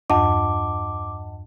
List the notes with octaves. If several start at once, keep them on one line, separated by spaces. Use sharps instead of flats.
E2 G2 D#5 F#5 A5 D6